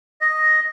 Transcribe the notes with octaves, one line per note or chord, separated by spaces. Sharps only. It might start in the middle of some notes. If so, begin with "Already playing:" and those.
D#5